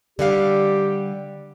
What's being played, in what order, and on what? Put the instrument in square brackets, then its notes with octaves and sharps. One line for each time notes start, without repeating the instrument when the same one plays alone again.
[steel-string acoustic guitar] D3 G3 [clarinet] G4 [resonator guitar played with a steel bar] D5 F5